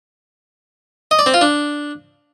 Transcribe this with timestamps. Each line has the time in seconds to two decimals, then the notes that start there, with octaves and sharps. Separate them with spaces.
1.11 D#5
1.19 D5
1.26 C4
1.34 F4
1.41 D4